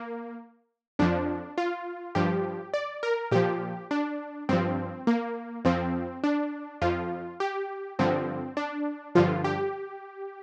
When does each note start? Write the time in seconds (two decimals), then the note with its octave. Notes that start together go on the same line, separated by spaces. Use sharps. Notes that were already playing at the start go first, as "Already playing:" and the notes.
Already playing: A#3
0.99 F2 F3 D4
1.58 F4
2.15 G2 F3 G4
2.74 D5
3.03 A#4
3.31 A#2 F3 G4
3.91 D4
4.49 G2 F3 C4
5.07 A#3
5.65 F2 F3 C4
6.24 D4
6.82 F2 F3 F4
7.40 G4
7.99 G2 D3 F3 C4
8.57 D4
9.15 G2 D3 F3 F4
9.44 G4